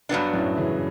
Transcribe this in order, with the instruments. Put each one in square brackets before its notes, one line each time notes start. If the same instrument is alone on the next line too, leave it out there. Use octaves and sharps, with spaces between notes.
[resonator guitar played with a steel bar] G2 F#3 B3 D4
[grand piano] F#2 A2
C#3 E3